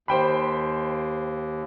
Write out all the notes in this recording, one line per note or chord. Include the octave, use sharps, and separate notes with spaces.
D#2 C5 G5 B5